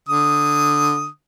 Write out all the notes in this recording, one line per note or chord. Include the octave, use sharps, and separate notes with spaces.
D3 D#6